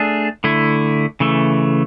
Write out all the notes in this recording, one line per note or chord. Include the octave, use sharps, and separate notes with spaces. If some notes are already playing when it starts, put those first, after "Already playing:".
Already playing: A3 D4 G#4
D3 A3 E4
C#3 E3 A3